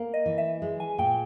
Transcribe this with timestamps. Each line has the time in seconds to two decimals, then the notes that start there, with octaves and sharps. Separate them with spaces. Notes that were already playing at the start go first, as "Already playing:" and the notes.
Already playing: A#3
0.14 D#5
0.26 E3
0.38 E5
0.62 G#3
0.80 G#5
0.98 A#2 G5